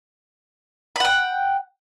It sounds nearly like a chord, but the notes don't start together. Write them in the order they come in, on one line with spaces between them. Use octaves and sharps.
B5 F#5 G5